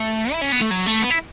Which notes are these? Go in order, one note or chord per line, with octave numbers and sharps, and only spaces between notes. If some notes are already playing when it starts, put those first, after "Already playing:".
Already playing: A3
E4
C#4
B3
A3
F#3
A3
B3
E4